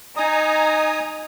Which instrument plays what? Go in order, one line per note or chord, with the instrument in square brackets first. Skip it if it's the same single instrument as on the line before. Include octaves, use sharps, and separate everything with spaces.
[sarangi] D#4 [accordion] G#5 A#5 D#6